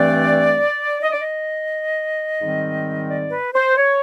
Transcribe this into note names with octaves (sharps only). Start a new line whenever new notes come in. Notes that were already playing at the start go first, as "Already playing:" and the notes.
Already playing: G2 E3 A3 C4 D5
D#5
D5
D#5
G#2 D#3 G3 C4
D5
B4
C5
C#5